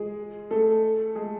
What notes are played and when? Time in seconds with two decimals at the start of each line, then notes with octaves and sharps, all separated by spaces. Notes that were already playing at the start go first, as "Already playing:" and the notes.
Already playing: G#3 G#4
0.51 A3 A4
1.15 G#3 G#4